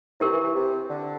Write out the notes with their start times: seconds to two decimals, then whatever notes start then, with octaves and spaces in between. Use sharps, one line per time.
0.20 C3 E4 G4 A#4
0.32 E3
0.43 E3
0.55 C3
0.90 D3